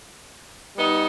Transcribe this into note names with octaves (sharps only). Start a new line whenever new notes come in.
G3 B3 D#4